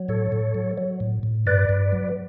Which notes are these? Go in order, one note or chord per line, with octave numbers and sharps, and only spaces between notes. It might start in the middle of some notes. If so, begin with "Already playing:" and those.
Already playing: F#3
A2 A4 C#5
A2
F#3
F#3
A2
A2
G2 B4 D5
G2
F#3